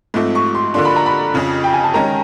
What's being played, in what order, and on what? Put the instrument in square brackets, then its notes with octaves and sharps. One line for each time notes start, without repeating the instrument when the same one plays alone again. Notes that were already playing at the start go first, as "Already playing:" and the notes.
[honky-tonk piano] G#2 F3 A3 C4
[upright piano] C#6
C6
[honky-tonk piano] D3 F3 A#3 D4 [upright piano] C6
[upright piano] B5
A#5
B5
[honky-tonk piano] F2 C#3 F3
[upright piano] G5
G#5
A5
[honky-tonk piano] D#3 G#3 C#4 [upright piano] A#5